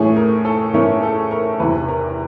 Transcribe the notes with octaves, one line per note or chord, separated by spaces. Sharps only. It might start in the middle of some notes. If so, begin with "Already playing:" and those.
Already playing: A2 E3 A3 C#4 G#4
A#4
A4
A2 E3 A3 C#4 A#4
A4
A#4
E2 C3 E3 B4
A#4